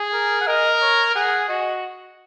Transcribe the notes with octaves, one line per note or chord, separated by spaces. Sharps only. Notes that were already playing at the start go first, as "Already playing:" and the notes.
Already playing: G#4
A#4
F#5
A#4 D#5
C#5
G#4 F#5
F#4 D#5